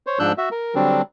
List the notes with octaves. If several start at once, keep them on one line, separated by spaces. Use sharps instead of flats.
C5 C#5
G#2 F3 D4 E6 F#6 G6
F#4 E5
A#4
D3 F#3 G3 C4 D4